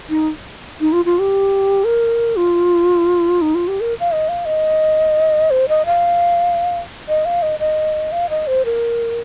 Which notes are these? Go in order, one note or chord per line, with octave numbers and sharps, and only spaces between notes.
D#4
D#4
F4
F4
G4
A#4
F4
D#4
F4
G4
A#4
F5
D#5
F5
D#5
C5
D#5
F5
D#5
F5
D#5
D#5
F5
D#5
C5
A#4